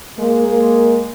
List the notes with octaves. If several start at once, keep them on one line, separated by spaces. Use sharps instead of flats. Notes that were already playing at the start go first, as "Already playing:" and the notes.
G#3 A#3
A#3